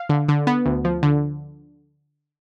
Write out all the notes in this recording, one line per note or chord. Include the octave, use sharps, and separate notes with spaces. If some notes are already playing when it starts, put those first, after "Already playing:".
Already playing: F5
D3
D3
B3
D2
F3
D3